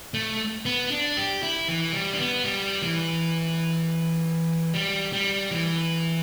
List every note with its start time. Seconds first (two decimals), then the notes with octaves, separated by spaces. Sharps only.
0.14 A3
0.65 B3
0.91 D4
1.17 G4
1.43 E4
1.68 E3
1.93 G3
2.13 D4
2.19 B3
2.45 G3
2.82 E3
4.74 G3
5.13 G3
5.51 E3